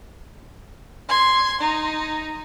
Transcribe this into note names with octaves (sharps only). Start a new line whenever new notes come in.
C6 G#6
D#4